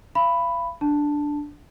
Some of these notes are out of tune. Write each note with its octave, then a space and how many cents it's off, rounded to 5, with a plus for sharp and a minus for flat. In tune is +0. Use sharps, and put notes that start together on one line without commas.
F5 -40 B5 +5
D4 +0 A5 +0